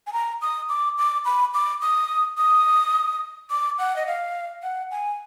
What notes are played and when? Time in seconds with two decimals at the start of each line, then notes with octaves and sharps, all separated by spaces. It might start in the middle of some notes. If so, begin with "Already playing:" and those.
0.07 G#5
0.13 A#5
0.42 D#6
0.69 D6
0.98 D6
1.25 B5
1.54 D6
1.82 D#6
2.38 D#6
3.50 D6
3.79 F#5
3.96 D#5
4.07 F5
4.63 F#5
4.91 G#5